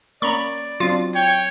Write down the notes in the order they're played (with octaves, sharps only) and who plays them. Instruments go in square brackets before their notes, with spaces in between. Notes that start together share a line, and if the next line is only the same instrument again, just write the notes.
[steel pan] A#3 C#4 [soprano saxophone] D5 [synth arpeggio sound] A#5 B5 C#6
[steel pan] F#3 C4 D4 [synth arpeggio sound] F4
[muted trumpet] C#5 [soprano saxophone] G5